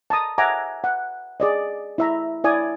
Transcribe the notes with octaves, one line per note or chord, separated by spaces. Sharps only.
A5 A#5 D#6
E5 F#5 G#5 A#5 D6
F#5
G#4 D5 D#5
E4 E5 A#5
E4 D5 G#5 D#6